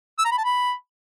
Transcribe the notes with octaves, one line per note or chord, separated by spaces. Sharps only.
E6
A#5
B5
A5
B5